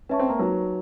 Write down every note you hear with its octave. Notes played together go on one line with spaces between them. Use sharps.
C#4 B4 E5 A5 C#6
C4
A#3
F#3 D#4 F#4 B4